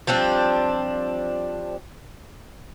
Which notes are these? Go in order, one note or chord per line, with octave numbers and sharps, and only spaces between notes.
F3 G3 C4 D4